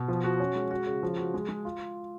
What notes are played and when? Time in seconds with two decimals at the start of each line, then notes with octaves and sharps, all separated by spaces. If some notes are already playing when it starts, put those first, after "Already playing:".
Already playing: B2
0.08 F3
0.24 F#4
0.40 C#4
0.56 G#3
0.71 F#4
0.87 C#3
1.03 F3
1.18 F#4
1.34 G#3
1.49 G#3
1.65 F4